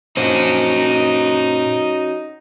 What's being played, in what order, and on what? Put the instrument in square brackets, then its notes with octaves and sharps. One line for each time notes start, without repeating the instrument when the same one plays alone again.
[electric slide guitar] A#2 C5 [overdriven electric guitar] C#4 F#4 [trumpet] D#4